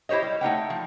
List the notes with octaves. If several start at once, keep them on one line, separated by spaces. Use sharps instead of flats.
E4 G4 C5 C#5 D#5
G3
A3 D#4 F#5 G5
F3